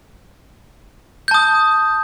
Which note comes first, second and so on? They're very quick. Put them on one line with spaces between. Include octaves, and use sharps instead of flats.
G6 A5 D#6